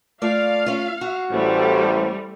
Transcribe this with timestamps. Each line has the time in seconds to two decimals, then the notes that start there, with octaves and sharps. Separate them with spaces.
0.22 A3 F4 D5 F5
0.66 C#4 F4
1.01 F#4
1.31 A1 A2 G3 A3 C5